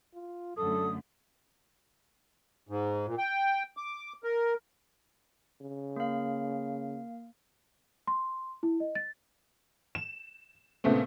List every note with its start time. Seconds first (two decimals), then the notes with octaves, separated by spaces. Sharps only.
0.14 F4
0.57 F#2 D3 A3 A4 D#6
2.69 G#2
3.06 A#2
3.18 G5
3.77 D6
4.24 A#4
5.61 C#3
5.96 A#3 F5
8.07 C6
8.63 E4
8.80 D#5
8.95 A6
9.95 E7
10.84 A#2 C#3 A3 B3 C4